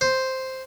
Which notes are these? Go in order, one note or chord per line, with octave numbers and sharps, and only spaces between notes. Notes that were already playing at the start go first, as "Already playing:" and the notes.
C5